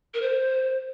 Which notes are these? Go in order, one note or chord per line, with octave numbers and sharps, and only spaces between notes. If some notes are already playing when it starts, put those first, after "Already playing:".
A#4
C5